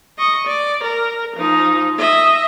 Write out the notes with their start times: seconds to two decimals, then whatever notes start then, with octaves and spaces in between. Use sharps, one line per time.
0.18 D#5 C#6
0.47 D5
0.84 A#4
1.37 F3 D#4
1.99 D#5 E5